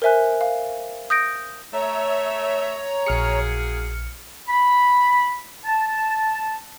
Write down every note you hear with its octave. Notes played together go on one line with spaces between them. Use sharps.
A#4 C5 E5 G#5 F#6
F5
D#6 G6 A#6 D7
A3 C#5 E5 A#5
A#1 F#3 A#3 G#4 F6 C#7
B5
A5